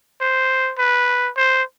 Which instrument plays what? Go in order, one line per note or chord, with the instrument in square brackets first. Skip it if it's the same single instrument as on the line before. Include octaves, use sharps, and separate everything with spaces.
[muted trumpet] C5
B4
C5